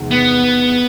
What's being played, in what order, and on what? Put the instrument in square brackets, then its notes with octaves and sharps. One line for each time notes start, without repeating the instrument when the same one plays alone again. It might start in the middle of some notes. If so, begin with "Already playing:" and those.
Already playing: [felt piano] E2 C3 D#3 G#3
[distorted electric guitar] B3